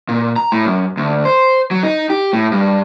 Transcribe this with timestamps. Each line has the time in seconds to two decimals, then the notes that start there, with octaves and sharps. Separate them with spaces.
0.09 A#2
0.36 A#5
0.52 A2
0.65 F#2
0.97 D2
1.25 C5
1.71 F#3
1.83 D#4
2.10 G4
2.33 A2
2.52 G2